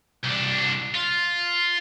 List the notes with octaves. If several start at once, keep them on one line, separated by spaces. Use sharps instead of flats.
C2 D4
F4